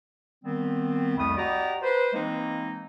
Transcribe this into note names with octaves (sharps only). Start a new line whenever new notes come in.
D#3 G3 B3 C4
C2 F2 A3 B5 D#6
F#4 G4 D5 D#5 A#5
B4 C5
E3 G#3 A#3 C4 D#4